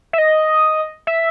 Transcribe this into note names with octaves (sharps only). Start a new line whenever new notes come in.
E5
D#5
E5